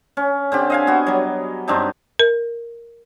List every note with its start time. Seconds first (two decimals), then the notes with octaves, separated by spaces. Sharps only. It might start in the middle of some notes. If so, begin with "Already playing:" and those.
0.17 C#4
0.52 D3 C4 G4
0.70 D#5 F5 G#5
0.87 B3 F#4
1.07 F#3 G3
1.68 G2 C4 D4 D#4
2.20 A#4